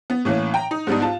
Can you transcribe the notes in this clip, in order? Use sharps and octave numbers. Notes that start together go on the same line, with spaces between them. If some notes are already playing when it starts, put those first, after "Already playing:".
B3
A2 E3 A#3 C#4
G5 A#5
D#4
G#2 G3 B3 D4 D#4
F4 A5